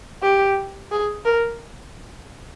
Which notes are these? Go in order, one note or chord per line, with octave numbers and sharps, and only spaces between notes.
G4
G#4
A#4